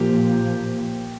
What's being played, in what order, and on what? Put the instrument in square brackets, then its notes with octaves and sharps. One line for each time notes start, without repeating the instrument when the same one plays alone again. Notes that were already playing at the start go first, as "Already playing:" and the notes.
Already playing: [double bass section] A#2 F3 A#3 [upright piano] G4